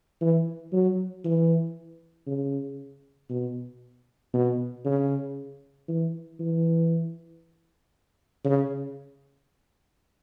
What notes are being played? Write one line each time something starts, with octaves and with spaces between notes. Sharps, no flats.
E3
F#3
E3
C#3
B2
B2
C#3
E3
E3
C#3